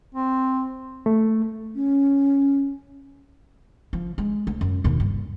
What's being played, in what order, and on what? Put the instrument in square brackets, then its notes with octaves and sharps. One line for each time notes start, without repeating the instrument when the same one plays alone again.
[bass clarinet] C4
[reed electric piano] A3
[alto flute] C#4
[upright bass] F3
G#3
D2
F#2
D#2 B2
G2